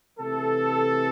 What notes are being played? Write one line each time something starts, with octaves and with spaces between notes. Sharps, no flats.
C3 E3 A3 A4